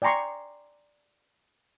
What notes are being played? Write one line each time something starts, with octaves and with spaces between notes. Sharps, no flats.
D5 G5 G#5 A#5 C6 C#6